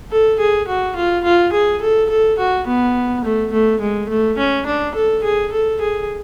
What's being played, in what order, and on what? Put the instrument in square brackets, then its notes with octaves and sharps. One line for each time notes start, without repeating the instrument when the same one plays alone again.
[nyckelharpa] A4
G#4
F#4
F4
F4
G#4
A4
A4
F#4
B3
A3
A3
G#3
A3
C#4
D4
A4
G#4
A4
G#4